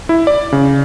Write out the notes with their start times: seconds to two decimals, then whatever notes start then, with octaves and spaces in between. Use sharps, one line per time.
0.09 E4
0.27 D5
0.52 C#3